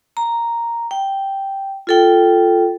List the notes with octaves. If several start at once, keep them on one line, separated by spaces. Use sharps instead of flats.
A#5
G5
F4 A4 G5